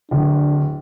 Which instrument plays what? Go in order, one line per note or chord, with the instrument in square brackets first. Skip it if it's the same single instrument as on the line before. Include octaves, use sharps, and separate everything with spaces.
[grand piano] D1 [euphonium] D4